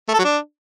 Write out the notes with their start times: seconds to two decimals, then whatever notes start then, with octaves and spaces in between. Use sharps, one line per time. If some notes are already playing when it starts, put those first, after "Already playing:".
0.09 A3
0.14 A4
0.19 F#3
0.24 D4